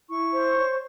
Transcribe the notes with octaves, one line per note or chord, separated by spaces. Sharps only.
E4 C#6
C5
C#5